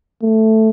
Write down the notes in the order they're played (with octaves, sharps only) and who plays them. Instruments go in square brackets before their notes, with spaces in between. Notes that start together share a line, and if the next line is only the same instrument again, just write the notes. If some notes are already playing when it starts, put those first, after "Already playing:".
[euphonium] A3